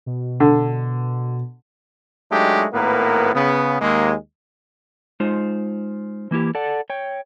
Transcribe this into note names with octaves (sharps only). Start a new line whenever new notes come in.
B2
D3
F#3 G#3 A3 D4 D#4 G4
G#1 A2 A#3 B3 A#4 B4
C#3 B3
D#2 G#3 A#3
G#3 D#4 F4 C5
E3 A#3 E4 G4
A4 D5 F#5
C#5 G5